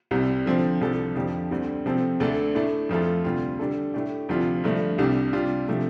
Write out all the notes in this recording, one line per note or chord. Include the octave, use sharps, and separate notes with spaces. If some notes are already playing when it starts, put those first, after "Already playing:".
C2 C3 G3
D3 F3 C4
C2 C3 F3 D4 A4
F2 D3 F3 D4 G4
D2 D3 G3 C4
C3 F3 C4 A4
D2 D3 A3 D4 A4
A2 A3 D4
F2 F3 A3 F4 A4
D2 C3 G3 F4
D3 G3 D4 A4
A2 A3 D4 G4
D2 C3 F3 D4 F4
G2 D3 F3 A3
C2 C3 G3 D4
C3 G3 D4 F4
C3 F3 A3 D4